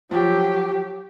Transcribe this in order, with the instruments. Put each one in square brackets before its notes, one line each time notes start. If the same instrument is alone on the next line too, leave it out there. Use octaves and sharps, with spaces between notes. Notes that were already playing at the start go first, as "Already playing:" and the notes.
[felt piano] F3 [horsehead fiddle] F#3 G4